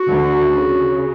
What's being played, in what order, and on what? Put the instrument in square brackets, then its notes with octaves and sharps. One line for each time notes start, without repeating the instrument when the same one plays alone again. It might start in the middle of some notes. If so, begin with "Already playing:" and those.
Already playing: [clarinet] F#4
[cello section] D2 D3
C#3